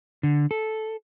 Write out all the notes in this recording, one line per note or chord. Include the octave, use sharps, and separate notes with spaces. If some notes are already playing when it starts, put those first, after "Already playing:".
D3
A4